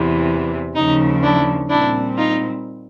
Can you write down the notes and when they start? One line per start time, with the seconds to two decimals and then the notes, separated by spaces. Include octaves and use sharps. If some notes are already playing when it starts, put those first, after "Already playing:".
Already playing: E2 C3 E3
0.75 D#2 C#3 F3 D#4
1.23 D4 E4
1.69 A#2 G3 C4 D4 E4
2.18 D#4 F4